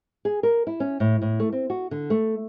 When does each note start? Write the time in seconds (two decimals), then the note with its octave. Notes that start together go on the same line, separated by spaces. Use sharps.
0.25 G#4
0.43 A#4
0.67 E4
0.80 C#4
1.00 A2
1.22 A2
1.40 A3
1.52 C4
1.70 F#4
1.91 D3
2.10 A3